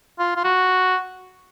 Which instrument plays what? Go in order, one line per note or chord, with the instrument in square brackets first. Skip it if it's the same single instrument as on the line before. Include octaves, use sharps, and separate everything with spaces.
[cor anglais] F4
F4
F#4